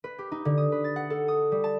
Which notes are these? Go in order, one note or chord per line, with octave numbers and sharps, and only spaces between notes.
B4
G4
D#4
D3
D#6
B4
A6
F#5
A4
D#6
G3
A5